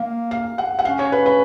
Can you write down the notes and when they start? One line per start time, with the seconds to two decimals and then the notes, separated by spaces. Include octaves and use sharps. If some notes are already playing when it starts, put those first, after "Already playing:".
Already playing: A#3 F5
0.31 F5
0.58 F#5
0.79 F#5
0.85 C#4 F5
0.99 C#5
1.12 B4
1.26 B4